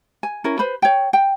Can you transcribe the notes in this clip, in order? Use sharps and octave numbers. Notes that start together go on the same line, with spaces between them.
G#5
C#4 E4 A#4
B4 C5 B5
C#5 G5
G5